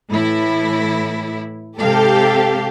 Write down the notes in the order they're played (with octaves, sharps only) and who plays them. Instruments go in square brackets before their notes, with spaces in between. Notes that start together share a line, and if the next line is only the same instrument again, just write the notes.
[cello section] A2 E3 E4
[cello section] G#2 C3 F5 [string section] G4 A4